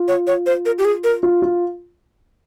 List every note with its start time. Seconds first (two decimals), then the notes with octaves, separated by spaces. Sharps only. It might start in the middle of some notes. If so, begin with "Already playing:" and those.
Already playing: F4
0.08 C#5
0.27 C#5
0.46 C5
0.66 A#4
0.79 G4
0.85 G#4
1.04 A#4
1.23 F4
1.42 F4